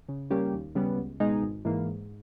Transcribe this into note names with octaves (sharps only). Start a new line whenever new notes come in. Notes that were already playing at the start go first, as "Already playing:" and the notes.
C#3
G3 A#3 C#4 G4
D#2
C#3 G3 B3
C#2
B2 G#3 D#4 G#4
G#1
G#2 E3 A#3
G#2